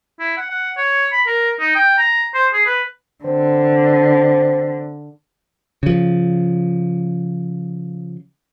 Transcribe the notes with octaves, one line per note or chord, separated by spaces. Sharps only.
E4
F#5
F#5
C#5
B5
A#4
D#4
G5
A#5
C5
G#4
B4
D3 C4
C#3 F3